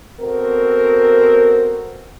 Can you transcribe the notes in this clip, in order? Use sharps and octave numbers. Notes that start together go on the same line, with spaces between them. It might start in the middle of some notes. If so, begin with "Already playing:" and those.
A3 B3 C4 F#4 A#4